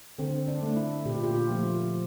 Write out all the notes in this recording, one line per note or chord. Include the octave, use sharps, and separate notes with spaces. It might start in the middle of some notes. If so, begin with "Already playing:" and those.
D3 C4
D4
A3
E4
A#2 G4
F4
G4
F4
F3 A3
F4